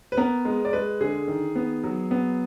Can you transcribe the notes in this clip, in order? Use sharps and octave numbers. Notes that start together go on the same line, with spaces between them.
B4
B3 A#4
G#3
D5
G#3 B4
D3 G#4
D#3
B3
F#3
B3